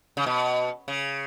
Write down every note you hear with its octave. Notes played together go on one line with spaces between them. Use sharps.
C#3
B2
C#3